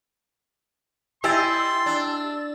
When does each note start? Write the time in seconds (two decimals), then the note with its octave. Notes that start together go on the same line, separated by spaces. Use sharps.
1.24 E4 G4 D#5 G#5 C6 E6 A6
1.86 D4